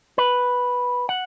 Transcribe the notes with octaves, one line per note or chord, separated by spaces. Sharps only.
B4
F#5